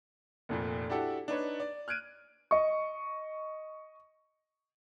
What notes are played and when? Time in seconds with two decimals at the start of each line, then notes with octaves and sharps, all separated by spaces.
0.49 F1 F2 A#2
0.90 D4 E4 F#4 G4 A4
1.28 D4 D#4 B4 C#5
1.60 D5
1.88 F6 F#6 G#6 D7 D#7
2.51 D#5 C#6